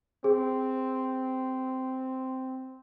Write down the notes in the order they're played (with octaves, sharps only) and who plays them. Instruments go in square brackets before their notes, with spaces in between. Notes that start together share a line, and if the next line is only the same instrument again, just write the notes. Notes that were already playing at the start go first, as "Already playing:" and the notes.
[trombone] C4 [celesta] G#4